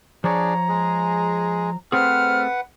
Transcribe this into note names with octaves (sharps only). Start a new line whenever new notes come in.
F3 D4 G#4 C#5 D5 A#5
G#3 G#4
A3 C4 G#4 B4 C5 F#5 F6